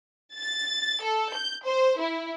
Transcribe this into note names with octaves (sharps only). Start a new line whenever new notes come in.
A6
A4
G6
C5
E4